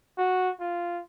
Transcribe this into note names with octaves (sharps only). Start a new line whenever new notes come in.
F#4
F4